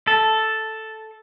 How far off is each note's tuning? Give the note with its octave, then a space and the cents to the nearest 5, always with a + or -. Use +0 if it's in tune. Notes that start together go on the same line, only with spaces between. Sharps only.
A4 +0